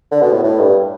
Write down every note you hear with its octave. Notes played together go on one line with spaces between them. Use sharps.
D3
B2
A2
A2
G2